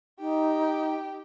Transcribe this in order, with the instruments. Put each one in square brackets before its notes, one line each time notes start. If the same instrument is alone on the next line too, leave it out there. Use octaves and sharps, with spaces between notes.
[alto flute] D#4 [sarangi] G4